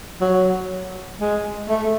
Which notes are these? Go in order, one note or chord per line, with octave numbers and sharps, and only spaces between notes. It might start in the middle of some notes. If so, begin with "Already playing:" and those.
F#3
G#3
A3